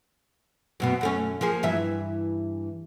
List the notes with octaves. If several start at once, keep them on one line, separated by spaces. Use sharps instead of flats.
F#2 B2 B3
F#2 A3 C#4
F3 A#3 G#4
G2 E3 E5